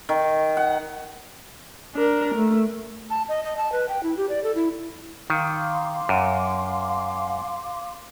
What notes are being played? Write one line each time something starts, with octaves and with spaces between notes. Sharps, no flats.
D#3
F#5
D4 A#4
A3
A5
D#5
D#5
A5
B4
G5
E4
G4
D5
A4
E4
D#3 F5 C6 D6
F#2